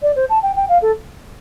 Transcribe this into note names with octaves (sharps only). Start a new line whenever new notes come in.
D5
C5
A5
G5
G5
F5
A4